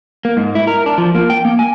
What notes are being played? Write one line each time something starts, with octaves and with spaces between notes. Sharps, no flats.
A#3
G#2
E4
A#4
D4
F3
A#3
G5
A#3
G#5